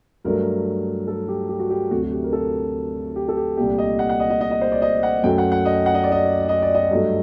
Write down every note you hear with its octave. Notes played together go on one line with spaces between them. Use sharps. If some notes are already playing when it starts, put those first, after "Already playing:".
G2 F#3 A3 A#4
A4
G4
G4
F#4
G4
D2 C3 F#3 A3 F#4
F#4
G4
A#4
A4
G4
A4
G4
C2 A#2 A3 G4
D#5
F#5
F#5
D#5
D#5
D#5
D#5
C5
D5
D#5
F#5
F#2 F#3 A3 G5
F#5
F#5
D#5
F#5
D#5
D5
D#5
D#5
D5
D#5
G2 F#3 A3